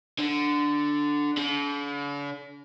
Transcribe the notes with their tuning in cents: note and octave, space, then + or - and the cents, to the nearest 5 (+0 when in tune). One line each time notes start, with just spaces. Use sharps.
D3 +0
D3 -45